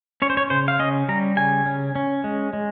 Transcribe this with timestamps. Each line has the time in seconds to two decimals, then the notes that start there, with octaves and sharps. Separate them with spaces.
0.22 C#4 C#5
0.30 C5
0.37 C#5
0.50 C#3 C5
0.68 F5
0.79 C#4 D#5
1.09 G3 A#5
1.37 C#3 G#5
1.66 C#4
1.96 C#4
2.24 G#3
2.53 G#3